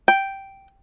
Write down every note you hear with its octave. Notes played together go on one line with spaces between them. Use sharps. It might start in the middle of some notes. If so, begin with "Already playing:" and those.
G5